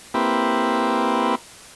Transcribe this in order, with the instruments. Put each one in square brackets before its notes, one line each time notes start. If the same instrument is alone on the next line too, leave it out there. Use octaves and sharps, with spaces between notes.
[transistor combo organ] A#3 C4 E4 G4 B4